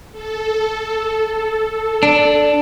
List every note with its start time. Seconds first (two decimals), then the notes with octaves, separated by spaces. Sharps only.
0.12 A4
2.03 D4